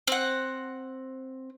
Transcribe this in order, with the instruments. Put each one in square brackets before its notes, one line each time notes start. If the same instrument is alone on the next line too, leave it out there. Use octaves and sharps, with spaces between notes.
[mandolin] C4 F#5